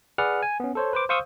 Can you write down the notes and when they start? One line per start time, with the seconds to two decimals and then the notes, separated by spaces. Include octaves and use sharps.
0.18 G#4 B4 D5 F#5 F6
0.43 G#5
0.60 B3 C#4
0.75 A4 C5 C#5
0.93 B4 C5 D6
1.09 C5 F5 C#6 D#6 E6 G6